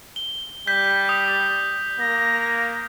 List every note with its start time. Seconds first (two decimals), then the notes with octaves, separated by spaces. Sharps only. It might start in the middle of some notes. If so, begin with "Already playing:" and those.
0.16 G7
0.67 G3 G6 B6
1.09 D#6
2.00 A#3 A#6